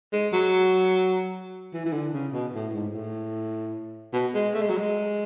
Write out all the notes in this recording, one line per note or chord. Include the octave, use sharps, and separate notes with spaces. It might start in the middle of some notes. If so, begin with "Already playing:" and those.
G#3
F#3
E3
E3
D3
C#3
B2
A2
G#2
A2
B2
G#3
A3
G#3
F#3
G#3